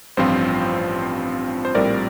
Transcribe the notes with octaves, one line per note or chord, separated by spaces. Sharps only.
A1 G2 F3 C4 F4 C5
C5
A#1 A2 G3 C4 F4 A#4 D5